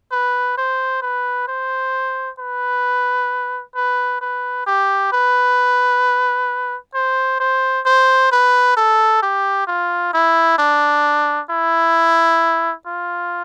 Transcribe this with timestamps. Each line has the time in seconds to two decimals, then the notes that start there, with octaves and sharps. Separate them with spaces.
0.12 B4
0.57 C5
1.02 B4
1.48 C5
2.39 B4
3.76 B4
4.21 B4
4.67 G4
5.13 B4
6.95 C5
7.40 C5
7.86 C5
8.32 B4
8.77 A4
9.23 G4
9.67 F4
10.13 E4
10.58 D4
11.50 E4
12.87 F4